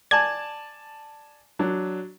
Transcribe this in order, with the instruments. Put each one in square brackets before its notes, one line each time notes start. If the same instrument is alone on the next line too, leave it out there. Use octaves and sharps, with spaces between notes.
[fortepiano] D5 G#5 A5 [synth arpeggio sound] G#6
[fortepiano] F#3 D4